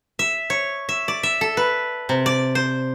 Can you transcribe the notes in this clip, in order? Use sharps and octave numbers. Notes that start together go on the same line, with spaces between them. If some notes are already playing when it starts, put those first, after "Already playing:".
E5
C#5
E5
D5
E5
A4
B4
C3
D5
C5